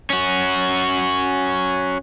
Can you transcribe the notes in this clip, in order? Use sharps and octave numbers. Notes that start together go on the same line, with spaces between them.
C#4 F#4